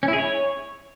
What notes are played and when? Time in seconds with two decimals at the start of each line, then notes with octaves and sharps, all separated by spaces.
0.03 C#4
0.08 E4
0.13 G#4
0.18 C#5